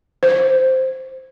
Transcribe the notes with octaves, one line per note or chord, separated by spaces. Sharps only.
C5